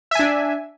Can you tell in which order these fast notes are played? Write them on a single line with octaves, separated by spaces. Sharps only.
E5 G#5 D4